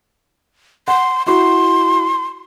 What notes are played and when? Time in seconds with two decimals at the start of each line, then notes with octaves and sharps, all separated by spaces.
0.88 F#5 C6
1.26 E4 F#4 C6